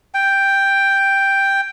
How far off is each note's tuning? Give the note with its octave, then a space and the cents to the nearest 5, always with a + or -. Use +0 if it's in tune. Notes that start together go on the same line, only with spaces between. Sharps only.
G5 +5